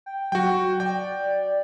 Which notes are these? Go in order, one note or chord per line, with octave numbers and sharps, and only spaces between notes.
G5
F#3 F#4 G5
D5 G5